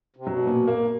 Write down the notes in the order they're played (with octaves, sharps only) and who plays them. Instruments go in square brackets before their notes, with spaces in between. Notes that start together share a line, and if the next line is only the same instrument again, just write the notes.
[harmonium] C3
[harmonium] B2 [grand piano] F#3
[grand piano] A#2
A#3